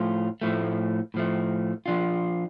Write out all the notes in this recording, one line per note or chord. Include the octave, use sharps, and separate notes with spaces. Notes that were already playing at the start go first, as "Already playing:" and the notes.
Already playing: A2 F3 A3 F4
A2 F3 A3
A2 F3 A3
F3 D4 F4